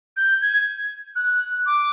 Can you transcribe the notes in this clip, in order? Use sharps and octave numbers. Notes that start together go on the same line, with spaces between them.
G6
G#6
F#6
D6